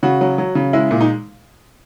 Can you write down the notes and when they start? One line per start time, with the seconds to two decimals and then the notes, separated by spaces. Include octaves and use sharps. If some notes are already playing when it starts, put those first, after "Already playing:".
0.03 C#3 F#4
0.21 F#3
0.38 F#3
0.55 C#3
0.73 G#3 E4
0.91 A#2
1.01 D#4